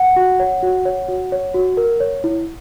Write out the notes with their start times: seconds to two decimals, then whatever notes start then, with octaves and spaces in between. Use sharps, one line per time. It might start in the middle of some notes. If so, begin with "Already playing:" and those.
Already playing: F#5
0.16 F#4
0.40 C#5
0.63 F#4
0.85 C#5
1.08 F#4
1.32 C#5
1.54 F#4
1.77 A#4
2.00 C#5
2.24 E4